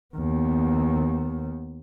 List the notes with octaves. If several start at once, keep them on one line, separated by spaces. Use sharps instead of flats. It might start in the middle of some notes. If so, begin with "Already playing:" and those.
D#2 B3